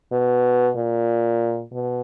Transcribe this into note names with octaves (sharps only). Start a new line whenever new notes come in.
B2
A#2
B2